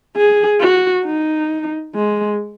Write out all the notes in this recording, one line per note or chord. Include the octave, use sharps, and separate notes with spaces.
G#4
F#4
D#4
G#3